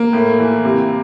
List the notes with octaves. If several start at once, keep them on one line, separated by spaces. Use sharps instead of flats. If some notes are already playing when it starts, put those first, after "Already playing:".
Already playing: A#3
A2
E3
C3